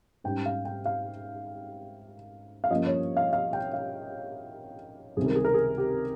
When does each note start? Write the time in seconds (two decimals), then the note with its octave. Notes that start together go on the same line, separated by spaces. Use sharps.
0.24 G#2 G3 C#4 G5
0.46 F5
0.65 G5
0.86 F5
2.64 F5
2.71 G2 F3 A#3 C#4 D#5
2.86 C#5
3.17 F5
3.33 F5
3.53 G5
3.73 F5
5.17 C#2 C3 D#3 G3 C4 G#4
5.26 A#4
5.36 G#4
5.45 A#4
5.54 G#4
5.78 G4